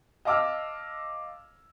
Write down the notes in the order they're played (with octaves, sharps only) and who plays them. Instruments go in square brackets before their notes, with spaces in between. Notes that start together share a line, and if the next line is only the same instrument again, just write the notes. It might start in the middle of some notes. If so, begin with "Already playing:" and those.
[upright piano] D#5 F5 A5 D6 E6 F6